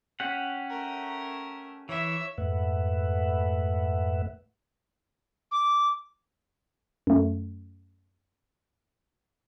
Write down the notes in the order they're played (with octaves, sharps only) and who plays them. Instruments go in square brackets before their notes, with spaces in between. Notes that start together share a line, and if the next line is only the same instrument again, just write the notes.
[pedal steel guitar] C#4 G4 F#5
[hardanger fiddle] A3 A#4
[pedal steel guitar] E3 [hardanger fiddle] C#5 E5
[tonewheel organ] F2 G#2 A3 B4 E5 F#5
[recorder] D6
[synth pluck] F#2 A3